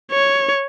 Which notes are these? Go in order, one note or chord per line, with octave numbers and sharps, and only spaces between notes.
C#5